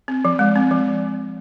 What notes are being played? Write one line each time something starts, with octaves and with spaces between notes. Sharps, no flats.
C4
F3
G#3
C4
F3